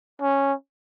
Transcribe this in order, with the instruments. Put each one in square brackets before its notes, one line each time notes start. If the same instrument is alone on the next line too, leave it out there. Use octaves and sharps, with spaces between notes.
[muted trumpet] C#4